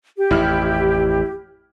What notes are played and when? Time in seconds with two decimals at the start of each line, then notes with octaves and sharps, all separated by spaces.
0.17 G4
0.31 A1 F2 E4 F6